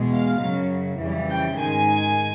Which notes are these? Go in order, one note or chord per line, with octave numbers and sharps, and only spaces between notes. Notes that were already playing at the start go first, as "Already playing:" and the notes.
Already playing: E2 B2 G#3
F5
F#2 C#3 F#3
F2 C#3 E3 G3
G5
G#2 D#3 G#3 G#5